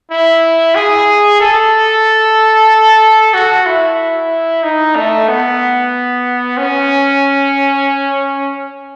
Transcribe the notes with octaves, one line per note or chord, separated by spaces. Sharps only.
E4
G#4
A4
F#4
E4
D#4
A3
B3
C#4